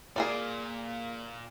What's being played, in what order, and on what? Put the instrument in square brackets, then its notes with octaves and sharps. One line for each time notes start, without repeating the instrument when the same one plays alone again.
[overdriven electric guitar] A#2 [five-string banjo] G#4 A#4 D5